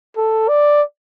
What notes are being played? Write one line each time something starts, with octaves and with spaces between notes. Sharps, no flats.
A4
D5